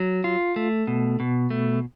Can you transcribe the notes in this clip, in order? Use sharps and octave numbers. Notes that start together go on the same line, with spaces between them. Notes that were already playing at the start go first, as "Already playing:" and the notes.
Already playing: F#3
F4
A3
B2
B2
A3